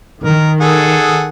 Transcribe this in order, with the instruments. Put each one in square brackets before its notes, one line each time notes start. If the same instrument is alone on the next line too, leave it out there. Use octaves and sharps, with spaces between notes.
[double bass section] D#3 [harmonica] A#4
[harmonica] G#4 A4 F#5